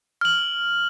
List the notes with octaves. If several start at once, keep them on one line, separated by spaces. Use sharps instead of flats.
F6 F#7